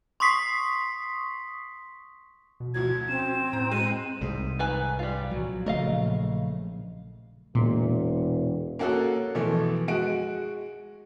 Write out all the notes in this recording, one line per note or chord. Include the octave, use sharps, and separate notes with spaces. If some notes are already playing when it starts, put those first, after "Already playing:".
C6 C#6 D#6 B6 C7
B2
D2 F3 F#3 G#6
C4 C#4 E7
A2 A#5
G#3 D#7
C2 G#2
D#3 B4 G#5
G3 F4
A#1 F#3
C#3 A3 A#4 D#5 F5
E1 A#2
A#3 C#4 F#4 G#4 A4
B2 E3 F3 A3
G#3 F#4 D7